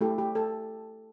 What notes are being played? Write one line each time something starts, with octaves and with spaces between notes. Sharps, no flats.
A3 E4 G4 A4
G4
A4